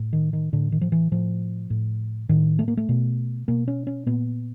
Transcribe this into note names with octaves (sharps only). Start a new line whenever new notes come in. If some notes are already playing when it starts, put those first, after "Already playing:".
Already playing: A2
D#3
D#3
A2 D3
D#3
F3
E3
A2 F3
A2
A2 D#3
A3
A#3
A3
B2
B2 A#3
C#4
C#4
A#2 B3